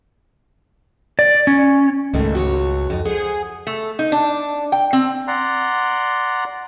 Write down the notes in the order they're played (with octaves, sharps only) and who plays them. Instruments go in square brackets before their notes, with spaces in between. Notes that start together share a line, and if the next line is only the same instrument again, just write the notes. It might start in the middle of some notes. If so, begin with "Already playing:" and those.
[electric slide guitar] D5
C#4
[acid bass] C#2 [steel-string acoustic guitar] G#2 D#3 A3
[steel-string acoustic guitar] F#4 C5 C#5
F2 D#4
[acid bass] G#4 [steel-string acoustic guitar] C5 F#5
[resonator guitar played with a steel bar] A3
D#4
D4
G5
C4
[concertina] D5 F#5 A#5 C6